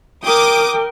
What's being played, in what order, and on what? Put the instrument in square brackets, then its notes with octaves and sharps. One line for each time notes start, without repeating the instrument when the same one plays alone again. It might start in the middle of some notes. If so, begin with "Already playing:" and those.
[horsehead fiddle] A#4 G5 [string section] D6 D#6